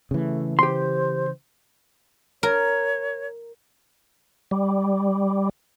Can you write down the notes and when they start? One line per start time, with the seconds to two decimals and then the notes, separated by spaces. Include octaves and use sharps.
0.11 C#3 E3 A3
0.59 G4 C5 C6
2.43 A#4 C#5
4.51 G3